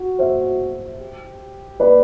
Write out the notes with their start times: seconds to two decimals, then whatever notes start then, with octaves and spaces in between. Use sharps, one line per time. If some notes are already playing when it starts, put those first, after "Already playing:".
Already playing: F#4
0.19 C5 E5
0.99 G4
1.80 B4 D5